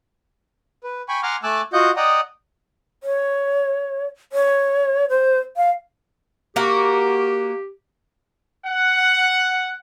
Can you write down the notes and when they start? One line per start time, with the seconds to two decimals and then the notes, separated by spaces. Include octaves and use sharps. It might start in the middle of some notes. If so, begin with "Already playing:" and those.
0.84 B4
1.08 G5 G#5 B5 C#6
1.23 F#5 G#5 A#5 C6 D6 F6
1.43 A3 G#5 A5 D6 E6 F#6
1.73 F4 F#4 D#5 F#5 G6
1.96 D5 D#5 F#5 G5 A#5 D#6
3.02 C#5
4.32 C#5
5.09 C5
5.57 F5
6.56 A#3 F#4 G4
8.66 F#5